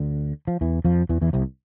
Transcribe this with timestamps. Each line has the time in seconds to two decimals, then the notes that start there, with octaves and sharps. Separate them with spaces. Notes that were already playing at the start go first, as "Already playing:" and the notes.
Already playing: D2 D3
0.48 F3
0.61 E2 E3
0.85 F2 F3
1.09 E2 E3
1.22 E2 E3
1.33 C2 C3